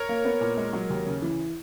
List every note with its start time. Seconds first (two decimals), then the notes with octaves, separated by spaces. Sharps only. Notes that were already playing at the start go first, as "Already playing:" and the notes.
Already playing: A#4 C#5
0.09 A#3
0.25 B3
0.41 A#2
0.57 G#3
0.73 F#3
0.90 D#2
1.06 C#3
1.22 E3